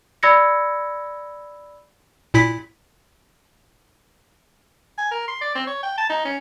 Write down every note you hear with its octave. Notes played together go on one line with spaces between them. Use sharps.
D5 B5 E6 G#6 A#6 C#7
A#2 E4 B6
G#5
A#4
C6
D5
C4
C#5
G5
A5
D#4
C#4